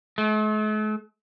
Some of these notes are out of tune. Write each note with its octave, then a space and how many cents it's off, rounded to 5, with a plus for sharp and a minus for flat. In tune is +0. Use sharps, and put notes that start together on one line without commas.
A3 -45